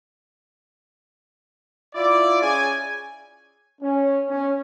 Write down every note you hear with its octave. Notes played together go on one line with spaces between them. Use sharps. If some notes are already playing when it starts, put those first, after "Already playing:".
E4 F4 D5
C#4 G#4 G#5
C#4
C#4